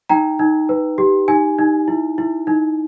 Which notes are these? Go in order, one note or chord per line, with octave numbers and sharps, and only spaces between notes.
D#4 G5 A#5
D#4
B4
G4
D#4 G#5
D#4
E4
E4
D#4